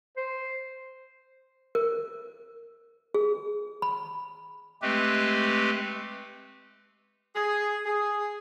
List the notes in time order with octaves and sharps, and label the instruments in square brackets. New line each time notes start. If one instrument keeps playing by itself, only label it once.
[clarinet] C5
[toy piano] A#4
G#4
B5
[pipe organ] G#3 A3 C4 G4 B4
[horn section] G#4
G#4